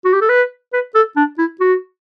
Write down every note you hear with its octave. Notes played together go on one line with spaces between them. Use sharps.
F#4
G4
A4
B4
B4
A4
D4
E4
F#4